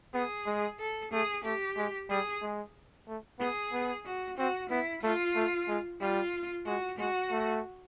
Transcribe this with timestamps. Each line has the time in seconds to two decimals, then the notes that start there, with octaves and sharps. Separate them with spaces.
0.14 B3 G#4
0.47 G#3
0.79 A4
1.12 A3 G#4
1.44 A3 G4
1.77 G#3
2.10 G3 G#4
2.42 G#3
3.08 A3
3.40 B3 G#4
3.73 B3
4.06 F#4
4.38 C4 F#4
4.70 B3 E4
5.03 A3 F4
5.36 A3
5.68 G#3
6.01 G3 F4
6.66 G#3 F#4
6.99 G#3 F#4
7.31 A3